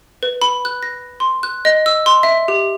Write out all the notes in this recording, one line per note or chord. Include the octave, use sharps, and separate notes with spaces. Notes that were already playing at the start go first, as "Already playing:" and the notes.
B4
B5
F#6
A#6
C6
F#6
D#5
E6
C6
E5
G4